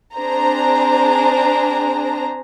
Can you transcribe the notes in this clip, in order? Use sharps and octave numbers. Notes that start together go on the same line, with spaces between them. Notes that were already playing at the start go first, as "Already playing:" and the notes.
C4 D4 G#4 C5 A#5